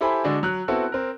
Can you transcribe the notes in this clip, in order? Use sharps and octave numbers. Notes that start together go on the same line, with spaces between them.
E4 G4 A4 C5 G#5 B5
D3 G#3 D4 F#4
F#3 F#6
B3 C4 E4 F#4 A4
C4 A#4